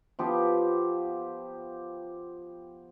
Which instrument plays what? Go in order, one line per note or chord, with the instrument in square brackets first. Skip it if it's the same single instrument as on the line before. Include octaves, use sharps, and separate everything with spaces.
[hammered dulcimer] F3 B3 G4